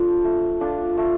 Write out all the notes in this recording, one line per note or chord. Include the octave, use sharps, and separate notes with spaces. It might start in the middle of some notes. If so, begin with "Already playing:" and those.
Already playing: F3 D4 A4
A3
D4 F4 A4
A3